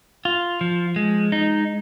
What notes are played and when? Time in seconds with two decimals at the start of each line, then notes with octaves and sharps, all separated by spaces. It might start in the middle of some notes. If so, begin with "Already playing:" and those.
0.25 F4
0.61 F3
0.96 G#3
1.32 D#4